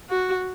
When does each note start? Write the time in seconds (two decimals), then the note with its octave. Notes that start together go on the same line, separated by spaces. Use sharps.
0.10 F#4